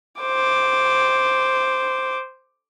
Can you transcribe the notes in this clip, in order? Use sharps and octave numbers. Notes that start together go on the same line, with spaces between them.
C5 D6